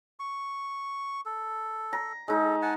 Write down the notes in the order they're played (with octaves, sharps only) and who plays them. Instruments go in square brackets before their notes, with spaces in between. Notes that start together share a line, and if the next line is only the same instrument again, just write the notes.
[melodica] C#6
A4
[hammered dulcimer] A#5
[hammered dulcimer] G#3 D#4 [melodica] A4
[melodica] F#5 G#5 A5